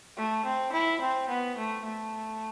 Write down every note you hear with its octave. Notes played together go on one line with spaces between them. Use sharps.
A3
C4
E4
C4
B3
A3
A3